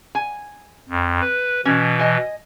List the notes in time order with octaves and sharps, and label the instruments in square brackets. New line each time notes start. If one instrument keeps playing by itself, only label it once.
[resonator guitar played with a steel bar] G#5
[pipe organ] F2
B4
[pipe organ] B2 E3 [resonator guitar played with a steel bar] C#4
[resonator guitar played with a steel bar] D#5 G#5